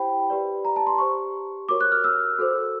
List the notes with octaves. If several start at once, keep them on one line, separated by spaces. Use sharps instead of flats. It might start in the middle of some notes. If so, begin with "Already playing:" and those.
Already playing: E4 G4 C5 G5 B5
G4 B4 D5
A#5
A5
C6
G4 C5 C#6
F#4 A#4 C#5 D6
F#6
F6
E6
F#4 A4 C5